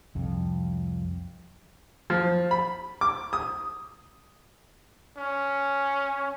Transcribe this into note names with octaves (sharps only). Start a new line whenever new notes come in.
C2 F2
F3
B5
D6
D#6
C#4